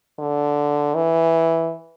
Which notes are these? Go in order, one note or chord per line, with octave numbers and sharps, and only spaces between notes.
D3
E3